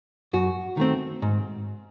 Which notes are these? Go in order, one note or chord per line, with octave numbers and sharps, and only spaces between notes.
F#2 F#4
D#3 A3 C4
G#2